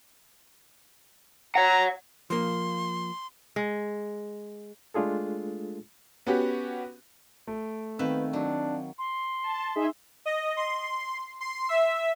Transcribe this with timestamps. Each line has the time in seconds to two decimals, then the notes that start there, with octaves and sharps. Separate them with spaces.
1.55 C#5 F#5 A#5
2.30 F3 A#3 C6
3.56 G#3
4.94 G#3 A3 D4 F4 G#4 A4
6.27 B3 C#4 F#4 G4
7.47 A3 D7
7.99 D#3 B3 C4 B4 E5 F5 G5
8.33 F#3 D4
8.98 C6
9.43 A5
9.75 D#4 G#4 E5
10.26 D#5
10.57 C6
11.41 C6
11.69 E5